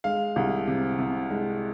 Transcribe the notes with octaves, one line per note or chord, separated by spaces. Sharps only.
G#3 F5
C2
C3
C3
G#3